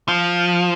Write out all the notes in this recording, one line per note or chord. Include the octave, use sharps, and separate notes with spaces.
F3